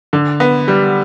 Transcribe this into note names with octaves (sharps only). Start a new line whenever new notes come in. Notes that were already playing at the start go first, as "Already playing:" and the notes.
D3
B3
G3